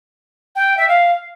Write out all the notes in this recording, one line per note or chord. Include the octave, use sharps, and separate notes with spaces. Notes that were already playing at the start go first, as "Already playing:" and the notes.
G5
E5
F5